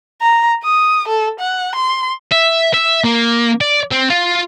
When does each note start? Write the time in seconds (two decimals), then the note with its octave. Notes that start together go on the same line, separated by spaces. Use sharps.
0.22 A#5
0.64 D#6
1.08 A4
1.40 F#5
1.75 C6
2.32 E5
2.74 E5
3.04 A#3
3.61 D5
3.91 C4
4.10 F4